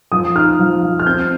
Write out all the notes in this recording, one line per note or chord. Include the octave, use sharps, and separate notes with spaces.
F3 D#6
D#4 F6
F3
F3
F6
C4 G6